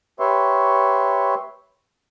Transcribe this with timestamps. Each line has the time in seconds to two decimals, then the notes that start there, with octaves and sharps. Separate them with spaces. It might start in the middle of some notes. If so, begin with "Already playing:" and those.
0.20 G4 B4 C#5 E5 C6 C#6